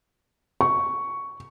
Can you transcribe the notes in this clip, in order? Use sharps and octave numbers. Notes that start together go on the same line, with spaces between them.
C#6